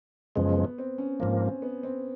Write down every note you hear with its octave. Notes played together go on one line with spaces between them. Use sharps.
F#2 C#3 F3 G#3 B3
B3
C4
C#4
G#2 F3 A#3 C#4
C4
B3
C4